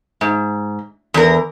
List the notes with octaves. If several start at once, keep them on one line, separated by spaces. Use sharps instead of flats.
G#2
E2 A#4